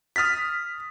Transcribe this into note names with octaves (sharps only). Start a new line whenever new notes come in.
D#6 F6 A6 B6